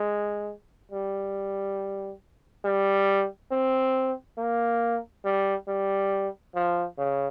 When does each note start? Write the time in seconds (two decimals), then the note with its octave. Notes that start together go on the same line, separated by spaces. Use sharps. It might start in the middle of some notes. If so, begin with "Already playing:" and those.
Already playing: G#3
0.91 G3
2.65 G3
3.51 C4
4.38 A#3
5.25 G3
5.68 G3
6.55 F3
6.98 C#3